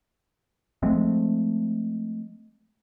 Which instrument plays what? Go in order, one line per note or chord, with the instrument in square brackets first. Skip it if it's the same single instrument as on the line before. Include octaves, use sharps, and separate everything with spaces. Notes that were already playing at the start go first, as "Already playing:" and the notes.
[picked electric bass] F3 G#3 A3 C4